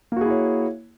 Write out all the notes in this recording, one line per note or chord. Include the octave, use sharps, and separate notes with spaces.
A#3 E4 F#4 G#4 C#5